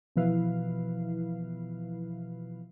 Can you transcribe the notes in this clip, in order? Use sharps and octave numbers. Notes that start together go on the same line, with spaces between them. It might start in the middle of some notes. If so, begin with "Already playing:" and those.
B2 E3 F3 E4 B4 F5